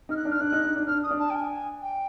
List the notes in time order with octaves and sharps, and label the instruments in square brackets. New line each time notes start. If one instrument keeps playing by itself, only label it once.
[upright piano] D#4 [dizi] F6
[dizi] F#6
[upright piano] D4
[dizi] F6
[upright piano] D4 [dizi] F#6
[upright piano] D#4
D#4
D4
[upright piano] D4 [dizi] F6
[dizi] D#6
[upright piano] D4
[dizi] A5
G5
G#5
G5